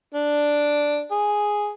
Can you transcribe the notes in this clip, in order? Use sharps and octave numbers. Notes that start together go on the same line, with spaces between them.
D4
G#4